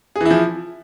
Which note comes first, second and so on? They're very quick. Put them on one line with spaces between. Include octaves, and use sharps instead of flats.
G#4 E3 E4 F3